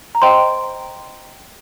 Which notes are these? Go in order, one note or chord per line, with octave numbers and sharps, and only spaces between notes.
A#5
C5 D#5 G5 C6